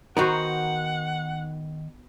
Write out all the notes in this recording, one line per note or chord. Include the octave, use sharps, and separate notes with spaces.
D#3 B3 D#4 F#4 A#4 C5 F#5